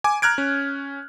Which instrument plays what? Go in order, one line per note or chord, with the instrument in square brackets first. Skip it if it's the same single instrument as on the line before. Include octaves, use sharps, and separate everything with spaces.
[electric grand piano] G#5 D6
A#5 F6 F#6 G#6 D7
C#4